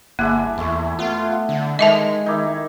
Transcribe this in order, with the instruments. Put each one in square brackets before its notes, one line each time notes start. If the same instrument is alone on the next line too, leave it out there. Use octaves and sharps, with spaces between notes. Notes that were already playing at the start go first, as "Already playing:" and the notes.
[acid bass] G1 [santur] G#3 D4 E4 [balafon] A#3
[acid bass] E2 [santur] A3 E4
[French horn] A3 [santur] B3 [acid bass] F4
[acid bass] D3
[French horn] D#3 [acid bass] G#3 [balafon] D#5 E5 A5
[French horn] D#3 [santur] D#4 E4 D6